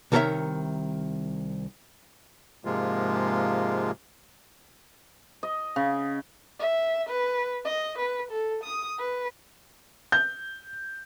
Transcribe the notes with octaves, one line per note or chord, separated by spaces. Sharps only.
C2 D#3 A4 A#4 C#5 E5
G#2 C3 F3 G#3 A#3 F4
D#5
C#3
E5
B4
D#5
B4
A4
D#6
B4
G6